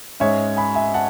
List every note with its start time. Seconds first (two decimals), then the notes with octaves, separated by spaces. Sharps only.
0.20 G#2 G#3 C#4 C#5 E5
0.57 G#5 B5
0.75 E5 G#5
0.94 F#5 A5